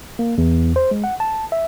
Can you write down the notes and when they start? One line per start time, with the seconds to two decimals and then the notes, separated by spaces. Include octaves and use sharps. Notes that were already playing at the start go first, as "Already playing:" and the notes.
0.19 A#3
0.38 E2
0.76 C5
0.91 G#3
1.04 F#5
1.20 A5
1.52 E5